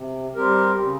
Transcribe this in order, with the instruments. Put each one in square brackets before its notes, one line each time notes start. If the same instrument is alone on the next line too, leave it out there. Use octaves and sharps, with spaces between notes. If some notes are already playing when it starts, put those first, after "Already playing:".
Already playing: [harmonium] C3
G3 C4 G4 A#4
C#3